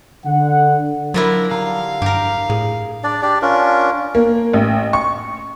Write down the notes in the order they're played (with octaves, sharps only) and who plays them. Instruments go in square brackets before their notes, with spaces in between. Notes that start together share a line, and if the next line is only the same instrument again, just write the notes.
[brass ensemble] D3 F#5
[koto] F3 D4 E4 [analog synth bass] F#3 [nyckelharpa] A#4
[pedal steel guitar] D3 G3 A#5 [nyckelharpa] F5
[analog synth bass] G2 [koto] G4 A#4
[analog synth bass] A2 [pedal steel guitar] G#4
[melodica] D4 D5
D4 G4 D5
C#4 D4 F4 A#4
[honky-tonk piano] A#3
A1
C#6